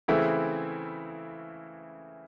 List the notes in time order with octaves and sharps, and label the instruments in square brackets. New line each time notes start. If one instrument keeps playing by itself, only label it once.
[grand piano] C#3 E3 A3 C4 E4